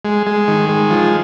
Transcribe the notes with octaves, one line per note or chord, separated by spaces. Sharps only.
G#3
G#3
D#3
G#3
F3